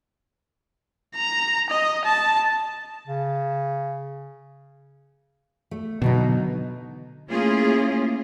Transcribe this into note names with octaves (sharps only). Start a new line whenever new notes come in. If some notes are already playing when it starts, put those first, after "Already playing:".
A#5
D#5
A5
C#3
A3
B2 D3 F#3 D#4
A3 A#3 C#4 E4 F4 G#4